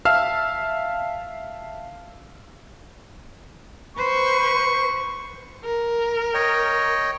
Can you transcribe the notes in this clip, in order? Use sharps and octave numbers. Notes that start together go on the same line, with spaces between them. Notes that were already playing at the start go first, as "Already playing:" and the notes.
E5 F5 A5 E6 F6
B4 C5 C#6
A#4
C#5 D#5 G5